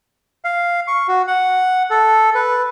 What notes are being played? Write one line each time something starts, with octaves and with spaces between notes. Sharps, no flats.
F5
C#6
F#4
F#5
A4
B4